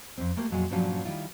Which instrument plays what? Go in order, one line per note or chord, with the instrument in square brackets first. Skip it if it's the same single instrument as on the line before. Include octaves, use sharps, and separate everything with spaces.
[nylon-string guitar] F2 C4
A3 A#3 G4 A#4
F2 A#2 F#3 G#3 G#4
G2 A#2 F3 F#3 C#4 F4
D#3 G3 E4 F4